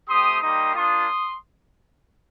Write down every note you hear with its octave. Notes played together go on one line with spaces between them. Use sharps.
A3 C4 G4 C6 D#6
G3 A#3 D#4 G4 C6 D#6
A#3 D4 F4 C6 D#6